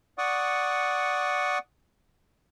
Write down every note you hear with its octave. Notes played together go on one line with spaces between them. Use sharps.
D5 F#5 C#6 D#6